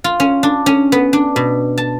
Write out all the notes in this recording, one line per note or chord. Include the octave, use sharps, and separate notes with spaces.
F4
C#4
D4
C#4
B3
D4
B2
A5